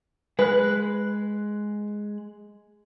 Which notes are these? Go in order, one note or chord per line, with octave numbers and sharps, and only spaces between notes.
G#3 B4 F#6